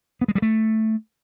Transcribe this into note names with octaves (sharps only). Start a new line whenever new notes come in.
B3
G#3
G3
A3